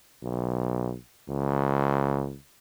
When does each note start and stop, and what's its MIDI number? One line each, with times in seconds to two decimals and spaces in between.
0.23 0.95 35
1.29 2.36 37